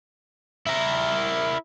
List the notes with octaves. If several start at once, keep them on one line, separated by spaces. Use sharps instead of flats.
E4 A#4